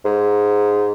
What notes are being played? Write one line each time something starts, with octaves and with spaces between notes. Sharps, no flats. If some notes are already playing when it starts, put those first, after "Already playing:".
G#2